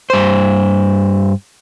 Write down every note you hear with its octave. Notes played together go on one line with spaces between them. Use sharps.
G2 C5